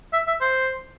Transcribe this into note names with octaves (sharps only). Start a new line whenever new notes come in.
E5
E5
C5